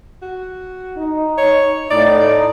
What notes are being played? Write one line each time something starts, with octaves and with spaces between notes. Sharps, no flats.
F#4
D#4
C#5
A2 D#4 D5